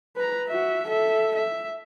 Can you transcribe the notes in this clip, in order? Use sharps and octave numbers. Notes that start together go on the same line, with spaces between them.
B4 A#5
F#4 E5
A4 E5
E5